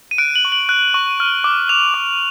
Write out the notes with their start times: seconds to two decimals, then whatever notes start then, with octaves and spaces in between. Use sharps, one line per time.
0.11 D#7
0.18 F#6 D7
0.35 F#7
0.45 C#6
0.52 F#7
0.69 F#6
0.94 C#6
1.20 F6
1.44 D6
1.69 F6 F7
1.94 D6